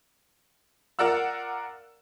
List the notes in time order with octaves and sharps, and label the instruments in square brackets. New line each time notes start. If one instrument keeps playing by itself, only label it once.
[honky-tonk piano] F4 A#4 D5 F#5 E6